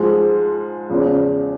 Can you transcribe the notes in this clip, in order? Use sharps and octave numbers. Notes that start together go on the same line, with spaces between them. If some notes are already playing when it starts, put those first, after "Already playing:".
Already playing: G#2 F3 G#3
E2 C#3 F3